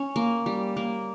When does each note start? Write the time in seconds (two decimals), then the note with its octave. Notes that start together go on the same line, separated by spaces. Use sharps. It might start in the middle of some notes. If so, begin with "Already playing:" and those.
Already playing: C#4
0.16 A#3
0.46 G3
0.77 A#3